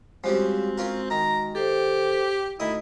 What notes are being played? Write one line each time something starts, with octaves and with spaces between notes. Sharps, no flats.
F3 G3 G#3 C4 C#4 F#4
C#4 F4 A#4
D#3 A#5
G4 A4 C5
D2 D#4 E4 D#5 D#6